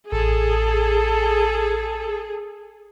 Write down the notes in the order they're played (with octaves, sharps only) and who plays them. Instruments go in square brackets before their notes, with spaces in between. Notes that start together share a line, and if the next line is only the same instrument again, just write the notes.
[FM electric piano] A1 [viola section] G#4 [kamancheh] A4